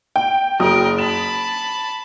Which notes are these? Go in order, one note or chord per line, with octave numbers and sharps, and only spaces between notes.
G5
F#1 F#3 A#4 G5 D#6
A5 B5 E7